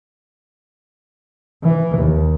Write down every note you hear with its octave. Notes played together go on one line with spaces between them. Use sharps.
E3
D#2